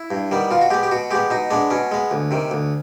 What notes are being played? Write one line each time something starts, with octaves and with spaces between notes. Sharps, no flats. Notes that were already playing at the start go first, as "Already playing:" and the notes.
Already playing: E4
G2
D#3 G3 B3
B2 F4
F#4
G#3 B3 G4
G4
B2 F#4
G#3 B3 G4
B2 D#4
G#3 B3 D4
B2 C#4
G#3 B3
D2
C3 D#3
D2